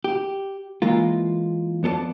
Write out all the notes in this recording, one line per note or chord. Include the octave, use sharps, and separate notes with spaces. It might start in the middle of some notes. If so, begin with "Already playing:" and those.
G4
E3 G#3 A#3 F4
F2 B3 A4 D5 A5